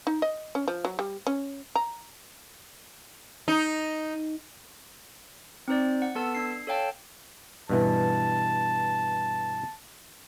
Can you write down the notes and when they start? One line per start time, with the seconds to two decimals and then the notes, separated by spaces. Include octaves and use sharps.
0.07 D#4
0.22 D#5
0.55 C#4
0.68 F3
0.85 F#3
0.99 G3
1.27 C#4
1.75 A#5
3.48 D#4
5.68 C4 D#4 C5 D5
6.02 F#5
6.15 B3 A4 A5 E6
6.35 D4 C7
6.67 A4 C#5 F5 G5 A5
7.69 G2 B2 E3 A5